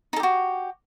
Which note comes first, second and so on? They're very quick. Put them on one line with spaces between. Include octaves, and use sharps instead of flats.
D#4 A4 G4 F#4